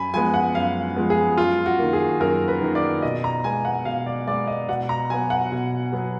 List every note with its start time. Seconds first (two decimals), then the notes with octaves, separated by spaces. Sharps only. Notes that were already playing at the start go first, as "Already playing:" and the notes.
Already playing: F#2 G#5 B5
0.14 F3 G#3 B3 G#5
0.34 F#5
0.55 F#2 F5
0.96 F3 G#3 B3
1.10 G#4
1.38 F#2 F4
1.66 F#4
1.79 D#3 A#3
1.93 G#4
2.20 F#2 A#4
2.48 B4
2.62 D#3 A#3
2.75 D5
3.02 B2 D#5
3.24 A#5
3.44 G#3 B3 G#5
3.65 F#5
3.85 B2 F5
4.06 D5
4.27 G#3 B3 D5
4.47 D#5
4.68 B2 F#5
4.89 A#5
5.10 F#3 B3 G#5
5.30 F#5
5.52 B2
5.93 F#3 B3